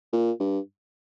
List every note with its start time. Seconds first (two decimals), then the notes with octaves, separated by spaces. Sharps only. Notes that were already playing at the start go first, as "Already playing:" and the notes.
0.13 A#2
0.40 G2